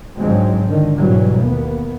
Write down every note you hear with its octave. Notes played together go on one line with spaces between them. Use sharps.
G#2 D3 F3 F#3 G#3 C4
D3 D#3
G#2 B2 E3 F#3 G3
D#2 A#3 B3